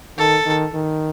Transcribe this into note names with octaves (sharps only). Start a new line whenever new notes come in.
D#3 A4
D#3
D#3